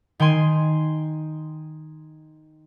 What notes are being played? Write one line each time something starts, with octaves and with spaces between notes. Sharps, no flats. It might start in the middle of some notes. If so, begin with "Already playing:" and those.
D#3 G5 G#5 C6 G#6 D#7